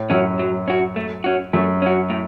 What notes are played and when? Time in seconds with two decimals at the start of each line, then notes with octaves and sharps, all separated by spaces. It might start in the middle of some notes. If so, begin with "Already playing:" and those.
Already playing: A2
0.10 F#2 C#4 F#4
0.39 F#3
0.68 C#4 F#4
0.96 A3
1.24 C#4 F#4
1.53 F#2 A3
1.82 C#4 F#4
2.10 A2